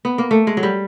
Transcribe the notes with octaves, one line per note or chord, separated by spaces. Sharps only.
B3
A#3
A3
G#3
F#3
G3